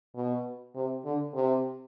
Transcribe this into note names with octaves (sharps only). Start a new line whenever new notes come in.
B2
C3
D3
C3